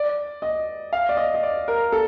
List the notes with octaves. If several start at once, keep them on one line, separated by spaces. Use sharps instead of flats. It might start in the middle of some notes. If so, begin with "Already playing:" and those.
Already playing: D5
D#5
F5
D5
D#5
D#5
D5
A#4
A4